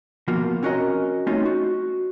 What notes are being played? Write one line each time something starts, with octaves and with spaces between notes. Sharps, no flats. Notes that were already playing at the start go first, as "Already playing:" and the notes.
B2 F3 A#3 F4 F#4
C4 C#4 F#4 A#4 D#5 A#5
A3 C4 C#4 D#4 F4
F#4